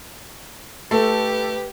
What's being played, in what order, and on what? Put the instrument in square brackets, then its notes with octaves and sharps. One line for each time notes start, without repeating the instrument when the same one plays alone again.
[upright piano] A3 [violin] G4 [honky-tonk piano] A4 [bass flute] B4